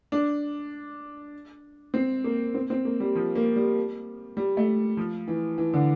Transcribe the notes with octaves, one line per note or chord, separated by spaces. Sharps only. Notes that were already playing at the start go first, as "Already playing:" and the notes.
D4
C4
A#3
C4
C4
A#3
G3
F3
A#3
G3
G3
A3
F3
E3
E3
D3